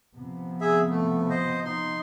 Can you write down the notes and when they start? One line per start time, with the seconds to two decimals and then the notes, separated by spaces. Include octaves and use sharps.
0.17 C3 F3 B3
0.61 G#4 E5
0.90 A3
1.30 C5 D#5
1.65 D#4 C6